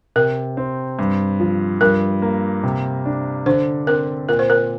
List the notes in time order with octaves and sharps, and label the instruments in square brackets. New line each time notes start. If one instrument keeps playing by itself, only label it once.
[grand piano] C3 [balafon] A#4
[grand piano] C4
G2
F3
[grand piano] G2 [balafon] A#4
[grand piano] A#3
C3
D4
[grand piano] D3 [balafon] C5
[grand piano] C4 [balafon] A#4
[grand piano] A#2 [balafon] A#4
[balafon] C5
A#4